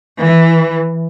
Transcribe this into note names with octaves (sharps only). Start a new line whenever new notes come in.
E3